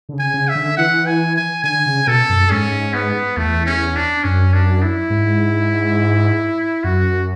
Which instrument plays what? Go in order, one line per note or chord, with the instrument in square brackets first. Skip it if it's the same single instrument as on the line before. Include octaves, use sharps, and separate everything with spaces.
[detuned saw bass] D3
C#3
[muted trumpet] G#5
[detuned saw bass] C#3
[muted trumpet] E5
[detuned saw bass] D3
[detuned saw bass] E3 [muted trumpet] F#5
[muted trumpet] G#5
G#5
[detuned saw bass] D3 [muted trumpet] G#5
[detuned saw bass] C#3
[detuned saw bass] B2 [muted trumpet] A4
[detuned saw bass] F#2
[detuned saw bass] G#2 [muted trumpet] C#4
[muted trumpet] B3
[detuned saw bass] E2 [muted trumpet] A3
[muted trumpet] C#4
D4
[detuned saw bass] F#2 [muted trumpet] C#4
[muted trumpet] D4
E4
[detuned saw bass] G#2
[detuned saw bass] F#2 [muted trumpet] F#4